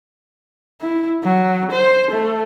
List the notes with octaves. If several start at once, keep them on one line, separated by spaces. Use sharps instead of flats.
E4
F#3
C5
A3